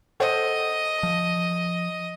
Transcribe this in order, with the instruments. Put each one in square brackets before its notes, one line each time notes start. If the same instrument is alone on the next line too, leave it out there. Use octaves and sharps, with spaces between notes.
[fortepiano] A4 C5 F#5 [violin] D#5
[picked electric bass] F3